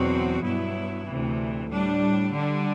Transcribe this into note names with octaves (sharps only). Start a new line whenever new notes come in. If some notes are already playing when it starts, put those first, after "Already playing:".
Already playing: E2 B2 F#3 C4 F#4
G2 F#3 B3 E4
D2 C3 E3
A2 G3 D4
D3 G3 D4